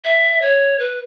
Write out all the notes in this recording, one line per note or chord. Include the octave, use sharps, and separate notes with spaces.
E5
C#5
B4